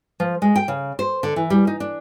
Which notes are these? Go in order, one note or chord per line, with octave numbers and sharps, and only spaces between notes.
F3
G#3
G5
C#3
C5
D3
E3
G3
D#4
D4